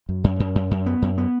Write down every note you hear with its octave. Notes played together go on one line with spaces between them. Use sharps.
F#2
F#2
F#2
F#2
F#2
B3
F#2
B3